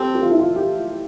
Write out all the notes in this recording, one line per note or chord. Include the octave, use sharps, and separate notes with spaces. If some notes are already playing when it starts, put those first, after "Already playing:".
Already playing: C4 G4 A4
G4
F4
E4
F4
G4